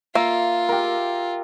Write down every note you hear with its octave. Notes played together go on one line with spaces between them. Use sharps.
A#3 F4 E5
G4 A#4